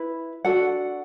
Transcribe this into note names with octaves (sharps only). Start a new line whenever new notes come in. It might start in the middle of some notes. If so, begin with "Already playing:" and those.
Already playing: E4 B4
D4 F#4 A4 F#5